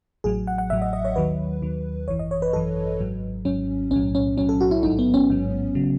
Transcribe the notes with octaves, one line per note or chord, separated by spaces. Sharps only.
A1 A2 F#3 G#4
F#5
F#5
A1 A2 F#3 E5
D#5
D#5
C#5
D#2 D#3 F#3 B4
D#2 D#3 F#3
G#1 F#2 E3 C#5
D#5
C#5
B4
G#1 F#2 E3 A4
G#1 G#2 F#3
G#1 G#2 F#3 C#4
B1 A2 F#3 C#4
C#4
B1 A2 F#3 C#4
A4
F#4
E4
A1 G#2 F#3 D#4
B3
C#4
A1 G#2 F#3
C#3 F#3